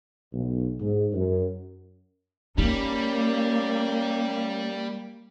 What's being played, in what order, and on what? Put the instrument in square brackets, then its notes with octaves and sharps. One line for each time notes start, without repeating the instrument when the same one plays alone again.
[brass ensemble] B1
G#2
F#2
[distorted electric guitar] G3 [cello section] A#3 [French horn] C#4 [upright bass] D#4